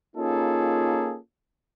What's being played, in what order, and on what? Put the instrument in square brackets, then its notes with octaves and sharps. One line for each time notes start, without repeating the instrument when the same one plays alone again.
[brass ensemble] A#3 C#4 D#4 F4 G#4 A4